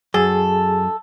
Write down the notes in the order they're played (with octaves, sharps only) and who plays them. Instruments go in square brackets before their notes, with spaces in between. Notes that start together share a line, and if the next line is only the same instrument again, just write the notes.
[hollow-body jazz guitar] F#2 [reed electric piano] G#4 [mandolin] A4